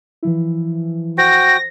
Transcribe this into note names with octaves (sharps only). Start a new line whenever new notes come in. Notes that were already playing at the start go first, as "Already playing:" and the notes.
E3 F3 E4
F#4 C5 G5 A#6